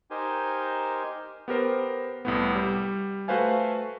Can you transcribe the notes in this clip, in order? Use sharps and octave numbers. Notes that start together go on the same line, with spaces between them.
D#4 G4 A#4 C5 G#5
B3 G4 A#4 C5
C2 A2 B3
G3
A3 F#4 B4 C5 F5 G#5